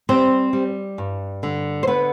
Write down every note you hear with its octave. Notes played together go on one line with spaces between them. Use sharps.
G3 C4 C5
G3
G2
D3
C5
D3 B3 B4